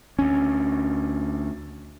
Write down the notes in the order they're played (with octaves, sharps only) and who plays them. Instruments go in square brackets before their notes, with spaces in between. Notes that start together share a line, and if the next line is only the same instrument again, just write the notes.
[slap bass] D2 C#4